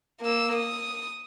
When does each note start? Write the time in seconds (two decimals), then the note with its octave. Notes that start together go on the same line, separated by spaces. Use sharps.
0.21 A#3 E6
0.55 D#6